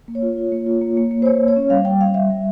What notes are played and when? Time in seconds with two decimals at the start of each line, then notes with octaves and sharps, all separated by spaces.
0.08 A#3
0.15 C#5
0.22 F4
0.37 F4
0.52 A#3
0.66 F4
0.81 A#3
0.97 A#3
1.11 A#3
1.22 C5
1.25 A#3 C#5
1.41 A#3
1.48 C#5
1.56 C#4
1.70 G3 F5
1.85 G3 G5
2.00 G3 F5
2.14 G3 E5
2.30 G3